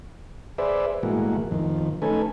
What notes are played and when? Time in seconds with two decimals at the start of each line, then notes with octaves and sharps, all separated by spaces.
0.58 G#4 B4 C5 D5 E5
1.03 A2 E3 G#3 A#3 F#4
1.51 F2 D#3
2.02 A3 C#4 D#4 A4 B4 G#5